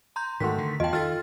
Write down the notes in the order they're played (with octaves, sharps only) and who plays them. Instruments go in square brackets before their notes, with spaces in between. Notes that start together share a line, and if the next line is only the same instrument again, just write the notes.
[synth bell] A#5 C6 G6
[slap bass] G#2 [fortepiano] D#3 A3 F#4 [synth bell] C6 B6
[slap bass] D3
[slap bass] E2 [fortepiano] F4 A5 [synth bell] D#5 G5
[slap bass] D#3 [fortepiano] F4 A4 [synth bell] F6 A6